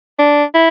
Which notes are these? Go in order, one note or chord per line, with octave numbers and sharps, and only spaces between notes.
D4
E4